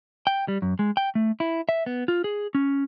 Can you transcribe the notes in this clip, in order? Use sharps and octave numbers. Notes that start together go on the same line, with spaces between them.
G5
G3
F#2
G#3
G5
A3
E4
E5
B3
F4
G#4
C#4